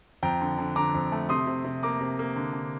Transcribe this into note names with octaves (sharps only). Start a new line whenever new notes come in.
F2 G5 A#5
D3
D3
D3 A#5 D6
F2
A3
C3 C6 D#6
C3
C3
A#3 A#5 D6
C3
A#3
D3
D3